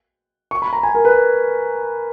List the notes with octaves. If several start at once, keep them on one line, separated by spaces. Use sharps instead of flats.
C#6
B5
A#5
G#5
A#4
B4